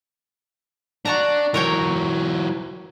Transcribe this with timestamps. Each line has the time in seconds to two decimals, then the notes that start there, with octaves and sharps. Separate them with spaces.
1.05 D4 F#4 A5 A#5
1.54 E3 F#3 A#4 C#5 G5